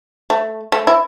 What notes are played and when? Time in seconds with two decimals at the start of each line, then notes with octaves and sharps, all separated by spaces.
0.30 A3
0.72 A3
0.87 E4